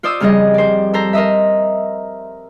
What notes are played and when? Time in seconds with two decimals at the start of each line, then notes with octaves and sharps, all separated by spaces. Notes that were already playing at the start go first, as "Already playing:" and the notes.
0.03 F4 C5 D5 D#6 E6
0.20 F2 C#3 G3 F4 G#4 D#5
0.54 C5 D5
0.94 A4 C5 A#5
1.13 A#4 C5 D#5 E5